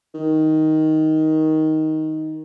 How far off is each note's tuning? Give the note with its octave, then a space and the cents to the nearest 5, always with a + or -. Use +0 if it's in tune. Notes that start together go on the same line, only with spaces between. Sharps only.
D#3 +10